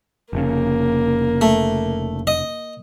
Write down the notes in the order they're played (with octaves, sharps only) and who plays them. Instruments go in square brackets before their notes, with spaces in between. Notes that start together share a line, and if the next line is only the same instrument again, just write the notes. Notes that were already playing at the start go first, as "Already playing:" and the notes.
[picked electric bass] F1 C#3 [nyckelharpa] A#3
[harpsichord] A3
D#5